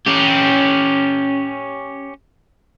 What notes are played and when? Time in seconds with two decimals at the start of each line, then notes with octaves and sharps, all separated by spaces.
0.07 C#4 G4